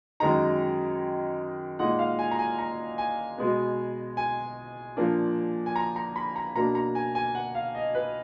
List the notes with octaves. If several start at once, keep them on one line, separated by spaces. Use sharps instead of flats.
F#2 D#3 G#3 D#4 A#5
A#2 G#3 D#4 F#5
F5
G#5
A#5
G#5
A#5
G#5
B2 G#3 B3
G#5
A#2 F3 A#3 D4
G#5
A#5
A#5
B5
A#5
B2 A#3 D4 A#5
A#5
G#5
G#5
F#5
F5
D#5
B4